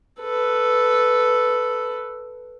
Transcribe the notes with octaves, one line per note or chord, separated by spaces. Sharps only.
A4 B4